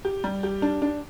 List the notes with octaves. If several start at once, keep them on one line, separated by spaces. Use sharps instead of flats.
G4
G3
G4
D4
D4